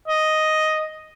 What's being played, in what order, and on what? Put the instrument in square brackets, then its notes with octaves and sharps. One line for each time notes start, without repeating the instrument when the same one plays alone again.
[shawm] D#5